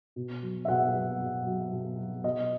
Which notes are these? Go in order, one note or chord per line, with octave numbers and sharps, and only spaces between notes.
B2
F#3
E5
B2 F#5
F#3
B2
F#3
B2
F#3
B2 D#5